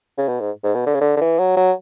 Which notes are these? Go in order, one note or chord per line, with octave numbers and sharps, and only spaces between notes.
C#3
B2
G#2
G#2
B2
D3
C#3
D3
D3
E3
F#3
F#3